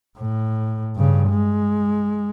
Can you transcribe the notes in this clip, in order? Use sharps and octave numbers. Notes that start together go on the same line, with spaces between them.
A2
G2 C#3
G#3